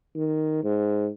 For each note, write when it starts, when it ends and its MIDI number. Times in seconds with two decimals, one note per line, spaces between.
0.15 0.60 51
0.64 1.08 44